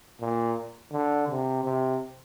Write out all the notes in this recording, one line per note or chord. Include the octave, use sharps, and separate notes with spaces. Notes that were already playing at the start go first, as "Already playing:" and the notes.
A#2
D3
C3
C3